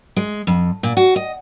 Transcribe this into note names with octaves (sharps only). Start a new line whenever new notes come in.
G#3
F2
A#2
F#4
D#5